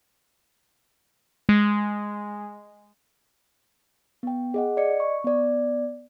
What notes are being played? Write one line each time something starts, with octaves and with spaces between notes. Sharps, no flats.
G#3
B3 G5
G#4 D#5 F#5
D5 D#5 C#7
C#6
B3 D5